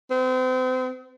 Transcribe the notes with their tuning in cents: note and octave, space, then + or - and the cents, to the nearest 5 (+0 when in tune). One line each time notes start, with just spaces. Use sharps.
C4 -35